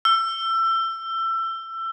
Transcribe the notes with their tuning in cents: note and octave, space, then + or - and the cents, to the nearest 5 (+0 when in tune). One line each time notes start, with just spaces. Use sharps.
E6 +25